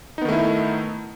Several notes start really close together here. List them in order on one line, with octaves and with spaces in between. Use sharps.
D#4 B3 D#3 A3 E4